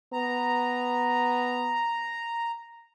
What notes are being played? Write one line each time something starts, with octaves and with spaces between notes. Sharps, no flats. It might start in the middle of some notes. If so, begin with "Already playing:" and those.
B3 A#5